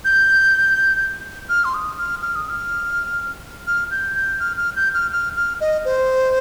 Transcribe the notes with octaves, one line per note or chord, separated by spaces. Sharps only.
G6
F6
C6
D#6
F6
F6
D#6
F6
F6
G6
G6
F6
F6
G6
F6
F6
F6
D#5
C5